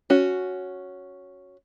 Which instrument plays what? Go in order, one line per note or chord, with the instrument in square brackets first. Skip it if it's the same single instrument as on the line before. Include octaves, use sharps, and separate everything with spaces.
[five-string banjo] C#4 F#4